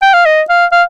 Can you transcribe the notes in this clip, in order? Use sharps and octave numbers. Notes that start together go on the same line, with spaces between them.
G5
F5
D#5
F5
F5